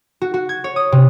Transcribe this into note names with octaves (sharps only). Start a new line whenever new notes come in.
F#4
F#4
G#6
C#5
D#6
C3